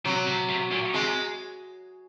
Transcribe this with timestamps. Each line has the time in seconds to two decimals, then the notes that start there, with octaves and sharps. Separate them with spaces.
0.05 C3 F#3
0.27 C3
0.49 C3
0.71 A#2
0.94 C3 G#3